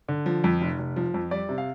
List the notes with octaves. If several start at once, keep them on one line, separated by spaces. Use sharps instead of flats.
D3
F3
F2
F1
F1
F3
F2
G3 D5
C3
F5